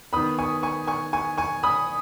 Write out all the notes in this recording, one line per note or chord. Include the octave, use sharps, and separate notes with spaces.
D#3 B3 B5 D#6
G#5 C#6
G#5 C#6
G#5 C#6
G#5 C#6
G#5 C#6
B5 D#6